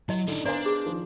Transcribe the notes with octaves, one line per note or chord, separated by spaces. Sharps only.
F#3 E4 D#5
D3 D#4 D5
B3 D4 A#4 C5 D5 F5 G#5
G#4
D#3 F3